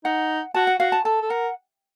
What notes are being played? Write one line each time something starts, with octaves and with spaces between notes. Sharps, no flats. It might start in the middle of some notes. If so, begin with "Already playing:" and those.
D#4 F#5
F#4 A5
F#5
F#4 F5
A5
A4 A5
A4
A#4 F#5